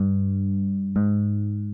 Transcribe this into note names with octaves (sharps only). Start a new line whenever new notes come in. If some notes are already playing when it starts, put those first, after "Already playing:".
Already playing: G2
G#2